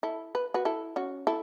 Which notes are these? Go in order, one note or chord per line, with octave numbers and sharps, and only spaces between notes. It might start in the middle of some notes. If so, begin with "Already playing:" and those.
E4 A4
B4
F#4 B4
E4 A4
C#4 F#4
E4 A4